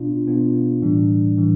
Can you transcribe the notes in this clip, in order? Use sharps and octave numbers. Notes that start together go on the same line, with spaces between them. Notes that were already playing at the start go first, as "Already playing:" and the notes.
Already playing: B2 B3 D4 F4
B2 B3 D4 F4
A2 E3 G3 D4
A2 E3 G3 D4